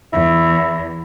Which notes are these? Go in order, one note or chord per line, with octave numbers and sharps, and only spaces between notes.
E2 E4